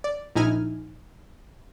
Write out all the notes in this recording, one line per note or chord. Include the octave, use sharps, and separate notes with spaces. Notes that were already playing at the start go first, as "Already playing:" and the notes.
D5
A#1 D#4 E4 G#5 F6